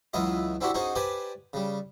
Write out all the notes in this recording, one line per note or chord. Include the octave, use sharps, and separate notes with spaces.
C#2 E3 F#3 E4 F4 D#5
C4 D4 E4 F#4 G4 C5
C#4 D#4 F#4 G#4 C5
G4 B4 C5 D5 G#5 A5
C#3 G3